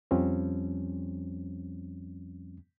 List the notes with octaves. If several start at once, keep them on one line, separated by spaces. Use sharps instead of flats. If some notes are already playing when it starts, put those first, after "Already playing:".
F2 F3 G3 C4 C#4